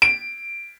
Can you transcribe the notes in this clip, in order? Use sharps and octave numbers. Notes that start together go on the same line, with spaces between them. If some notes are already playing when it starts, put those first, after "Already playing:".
D7